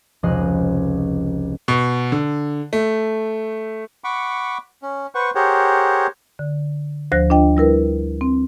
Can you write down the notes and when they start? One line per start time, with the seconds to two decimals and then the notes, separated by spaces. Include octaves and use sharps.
0.23 F1 C#2 F3 D#5 F#6 C7
1.68 B2
2.12 D3
2.73 A3
4.04 F#5 B5 C#6 D6
4.82 C#4
5.15 B4 C5 F#5 C#6
5.35 G4 G#4 A#4 C5 C#5 F#5
6.39 D3
7.12 D2 F3 C5 F#6 A#6
7.30 D4 F4 D#5 G5
7.57 G3 E4 A#4 B4
8.21 C4